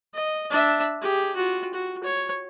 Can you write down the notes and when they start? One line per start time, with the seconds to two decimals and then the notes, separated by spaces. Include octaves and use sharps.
0.14 D#5
0.51 D4 E5
1.02 G4 G#4
1.36 F4 F#4
1.74 F#4
2.04 C#5